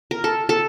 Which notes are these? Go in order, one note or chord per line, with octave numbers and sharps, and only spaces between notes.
A#4
A4
A4